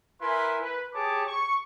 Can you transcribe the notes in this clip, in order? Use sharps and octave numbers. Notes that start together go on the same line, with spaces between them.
E4 A#4 B4 G#5 C6
B4
G4 G#4 C#5 A5 D6
C#6